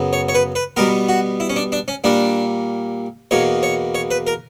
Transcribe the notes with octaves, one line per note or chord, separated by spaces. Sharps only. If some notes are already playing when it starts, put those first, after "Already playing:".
Already playing: F#2 C#3 F#3 B3
C#5
C#5
B4
B4
B2 G3 B3 A#4
F#4
E4
C#4
D4
D4
C#4
A#2 G3 A#3 D4
E2 B2 A#3 C#5
C#5
C#5
B4
A#4